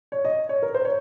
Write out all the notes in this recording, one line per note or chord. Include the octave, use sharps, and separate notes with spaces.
C#5
D#5
C#5
A#4
C5
C#5